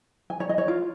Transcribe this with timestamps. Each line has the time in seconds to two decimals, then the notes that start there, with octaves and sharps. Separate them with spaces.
0.30 G#5
0.40 C#5
0.49 D#5
0.58 C#5
0.68 F4